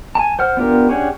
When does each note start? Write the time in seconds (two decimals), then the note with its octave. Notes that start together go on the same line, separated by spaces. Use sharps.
0.15 G#5 A5
0.39 C5 F#5 F6
0.57 B3 D4 F4 G4 A#4
0.89 C#4 D4 G4 G#4 F#5